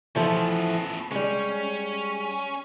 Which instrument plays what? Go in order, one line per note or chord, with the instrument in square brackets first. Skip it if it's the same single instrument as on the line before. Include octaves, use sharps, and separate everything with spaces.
[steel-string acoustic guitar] E3 F3 A4 [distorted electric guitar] A3 B3
[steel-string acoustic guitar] G3 G#3 [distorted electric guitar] C#4